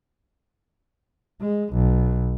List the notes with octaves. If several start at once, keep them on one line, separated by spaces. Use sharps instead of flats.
G#3
B1